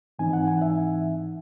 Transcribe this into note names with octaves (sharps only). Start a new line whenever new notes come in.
G#2 E3 C4 D#4 G#5
F#5
G#5
E5